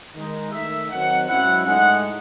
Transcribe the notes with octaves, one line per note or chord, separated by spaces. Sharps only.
D#3 G#3 D#4
D#3 A3 D#4 E5
D#3 F#3 C4 D#4 F#5
G#2 F#3 C#4 E4 F#5
A2 G#3 D#4 F#5